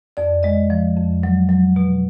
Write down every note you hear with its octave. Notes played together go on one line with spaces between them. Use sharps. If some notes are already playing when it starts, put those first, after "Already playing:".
F2 D5
G#3 D#5
F3
F2
F#3
F#3
B2